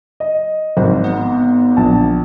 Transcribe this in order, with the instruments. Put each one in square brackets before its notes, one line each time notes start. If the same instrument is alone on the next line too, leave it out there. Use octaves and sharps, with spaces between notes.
[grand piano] D#5
[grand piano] G#1 G#2 [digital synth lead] F3
[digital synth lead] B3
[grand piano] A#1 D3 A5